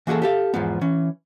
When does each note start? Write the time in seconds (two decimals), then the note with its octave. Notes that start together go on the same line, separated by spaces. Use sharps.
0.07 E3 A#3 F#4 G#4 A4
0.22 G4 A4 F5
0.54 E2 G#2 F3 B3
0.81 E3 C#4